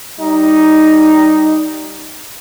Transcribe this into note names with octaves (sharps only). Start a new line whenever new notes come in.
G3 D#4